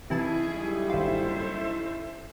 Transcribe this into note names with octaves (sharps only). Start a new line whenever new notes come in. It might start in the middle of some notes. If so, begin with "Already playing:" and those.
C3 E3 C#4 D#4 E4 G#4 G#5 A5
F#1 D3 G3
G#1 F4 A4 C5 E5